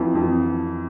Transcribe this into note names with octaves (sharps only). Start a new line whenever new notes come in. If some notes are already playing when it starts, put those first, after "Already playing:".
Already playing: F2 E3
F2